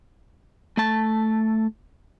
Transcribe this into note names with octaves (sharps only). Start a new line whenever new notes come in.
A3 A5